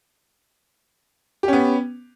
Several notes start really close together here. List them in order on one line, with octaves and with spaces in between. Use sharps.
G4 C#4 B3